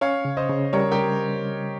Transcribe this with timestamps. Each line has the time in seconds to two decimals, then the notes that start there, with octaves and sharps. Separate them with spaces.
0.01 C#4 C#5 F5
0.25 C#3
0.37 C5 D#5
0.49 C#3
0.73 G3 A#4 C#5
0.91 G4 A#4